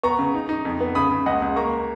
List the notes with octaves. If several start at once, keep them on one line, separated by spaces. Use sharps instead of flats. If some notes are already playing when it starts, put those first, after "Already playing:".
B3 A#5 C#6
C#3
D#4
D#4
F2
B3
C#3 B5 D#6
C#3
C#2 D#5 F#5
C#2
A#3 A#5 C#6